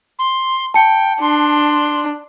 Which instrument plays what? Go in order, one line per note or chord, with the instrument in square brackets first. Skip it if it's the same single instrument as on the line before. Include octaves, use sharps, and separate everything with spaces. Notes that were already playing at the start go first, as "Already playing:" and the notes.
[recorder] C6
[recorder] G5 [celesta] A5 C#7
[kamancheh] D4 [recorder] C6